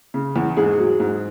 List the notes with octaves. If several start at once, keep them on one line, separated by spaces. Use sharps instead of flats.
C#3
E2
G#2 G#4
F#3
G#2